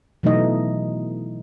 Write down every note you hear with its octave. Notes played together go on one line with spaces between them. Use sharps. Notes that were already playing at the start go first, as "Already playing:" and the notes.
B2 E3 F#3 A3 D#4 D#5